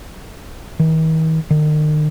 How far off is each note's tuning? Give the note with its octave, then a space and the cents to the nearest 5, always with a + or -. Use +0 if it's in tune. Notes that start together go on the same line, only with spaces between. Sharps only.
D#3 +45
D#3 -40